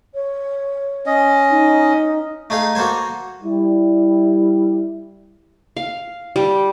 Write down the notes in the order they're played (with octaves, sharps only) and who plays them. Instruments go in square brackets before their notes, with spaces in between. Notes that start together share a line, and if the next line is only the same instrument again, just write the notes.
[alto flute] C#5
[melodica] C#4 D#5
[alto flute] D#4
[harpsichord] A3 D#4 G#4 F5
A#3 F#4 A4 C5 G#5
[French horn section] G3 E4
[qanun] F5
G3